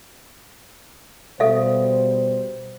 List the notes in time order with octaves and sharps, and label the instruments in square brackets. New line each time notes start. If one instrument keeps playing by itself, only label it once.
[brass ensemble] B2 G3 C5 [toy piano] A4 E5 F5